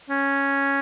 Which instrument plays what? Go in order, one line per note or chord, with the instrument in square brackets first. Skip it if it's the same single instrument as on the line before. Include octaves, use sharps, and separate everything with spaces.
[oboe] C#4